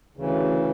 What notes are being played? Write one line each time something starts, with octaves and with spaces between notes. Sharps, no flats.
D2 C#3 E3